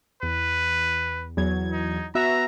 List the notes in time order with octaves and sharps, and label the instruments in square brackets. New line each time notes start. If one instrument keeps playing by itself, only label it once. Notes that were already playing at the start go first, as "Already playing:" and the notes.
[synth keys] E2 [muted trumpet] B4
[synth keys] E2 F#3 G#6
[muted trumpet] D#4
[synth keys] B3 F#4 E5 [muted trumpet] A#5